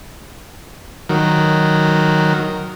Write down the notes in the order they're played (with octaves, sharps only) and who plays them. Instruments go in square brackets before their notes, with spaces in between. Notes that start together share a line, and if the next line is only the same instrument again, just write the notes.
[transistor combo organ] D#3 F#3 A#4